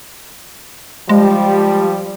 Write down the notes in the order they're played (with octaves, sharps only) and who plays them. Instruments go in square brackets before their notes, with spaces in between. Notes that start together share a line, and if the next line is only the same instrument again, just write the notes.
[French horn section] F3 G3 [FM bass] G#3